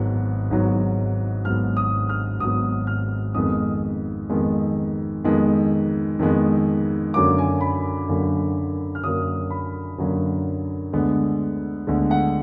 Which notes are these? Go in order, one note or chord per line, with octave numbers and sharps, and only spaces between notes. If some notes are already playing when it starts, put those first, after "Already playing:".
Already playing: G#1 G#2 F#3 B3
G#1 G#2 F#3 B3
G#1 G#2 F#3 B3 F6
D#6
F6
G#1 G#2 F#3 B3 D#6
F6
F2 D#3 G#3 B3 D#6
F2 D#3 G#3 B3
F2 D#3 G#3 B3
F2 D#3 G#3 B3
F#2 D3 F#3 A#3 D6
G#5
B5
F#2 D3 F#3 A#3
F6
F#2 D3 F#3 A#3 D#6
B5
F#2 D3 F#3 A#3
D2 D3 G#3 B3
D2 D3 G#3 B3
F#5